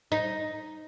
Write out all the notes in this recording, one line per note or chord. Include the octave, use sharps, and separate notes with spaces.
D#4